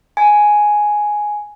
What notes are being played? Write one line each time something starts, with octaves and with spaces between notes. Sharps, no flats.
G#5